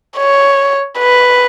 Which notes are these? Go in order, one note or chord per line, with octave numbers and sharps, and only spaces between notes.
C#5
B4